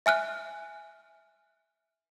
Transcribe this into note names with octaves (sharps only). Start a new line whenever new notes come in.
E5 G#5 F6 F#6